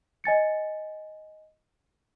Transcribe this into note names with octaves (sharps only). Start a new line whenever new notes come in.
D#5 G#5 A6 C#7